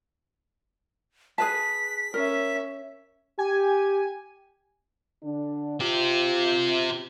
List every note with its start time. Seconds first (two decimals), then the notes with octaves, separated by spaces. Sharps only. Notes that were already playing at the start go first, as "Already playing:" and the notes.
1.38 G#4 B4 A5 B6
2.14 C#4 A#4 E5
3.39 G4 G#5
5.23 D3 D4
5.80 C4 F4 G4